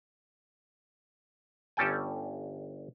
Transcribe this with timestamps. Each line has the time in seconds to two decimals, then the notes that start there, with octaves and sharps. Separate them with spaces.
1.77 G1 G3 C#4 A4 G5 G#5